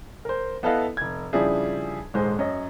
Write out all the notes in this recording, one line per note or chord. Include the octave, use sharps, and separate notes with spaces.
A#4 C5
B3 E4 A4 B4 D#5 F5
F1 G#6
C#3 F3 G3 D4 E4 G#4
D#1 G#2 G#3 C5
F#2 C#5 D#5